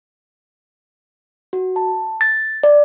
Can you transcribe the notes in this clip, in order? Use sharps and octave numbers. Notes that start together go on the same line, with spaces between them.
F#4
A5
A6
D5